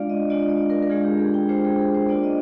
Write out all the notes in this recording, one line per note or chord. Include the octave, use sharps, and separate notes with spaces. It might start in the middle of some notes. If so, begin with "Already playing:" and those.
Already playing: G#3 D4 F4 D5 F5
D#5
G#3 D4 F4 D5
D5
A#4
A#4
G#3 D4 F4 G#4
G4
G#4
G5
G#3 D4 F4 C5
G#4
G#4
C5
A#3 D4 F4 D5
D#5